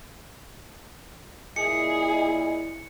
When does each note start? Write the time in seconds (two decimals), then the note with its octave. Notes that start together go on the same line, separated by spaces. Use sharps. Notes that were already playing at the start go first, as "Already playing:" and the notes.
1.56 A#2 E4 G#4 D#5 C#7